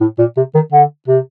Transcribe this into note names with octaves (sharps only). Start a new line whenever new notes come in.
A2
A#2
C3
D#3
D3
C3